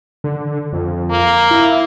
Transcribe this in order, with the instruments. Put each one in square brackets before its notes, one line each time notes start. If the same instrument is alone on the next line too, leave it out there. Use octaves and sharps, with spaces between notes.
[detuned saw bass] D3
F2
[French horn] A#3
[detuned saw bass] E4